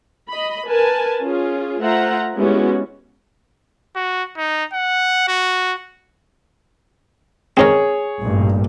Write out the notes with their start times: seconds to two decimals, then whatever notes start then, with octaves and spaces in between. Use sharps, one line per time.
0.29 D#5 B5
0.66 A#4 B4 G#5 A5
1.22 C#4 F4 G#4
1.81 A3 F4 C5 E5 F#5 A#5
2.36 G3 G#3 B3 C#4 E4 F#4
3.96 F#4
4.37 D#4
4.73 F#5
5.28 F#4
7.57 C4 D#4 G#4 A#4 C#5
8.20 A1 G2 A#2